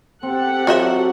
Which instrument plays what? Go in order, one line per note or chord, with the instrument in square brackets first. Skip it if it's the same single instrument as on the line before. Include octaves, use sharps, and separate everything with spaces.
[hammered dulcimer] C4 [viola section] G4 A4 F#5
[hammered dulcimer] F#3 [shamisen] F4 D#5 E5